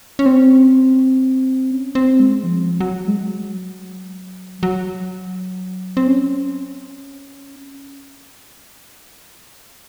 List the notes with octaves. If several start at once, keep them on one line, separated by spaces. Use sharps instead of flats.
C#4
C4
C#4
C4
G#3
F3
F#3
G#3
F#3
F#3
C4
C#4